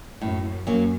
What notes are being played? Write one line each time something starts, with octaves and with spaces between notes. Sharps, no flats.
F#2 A2
F#2 F#3 A#3 C#4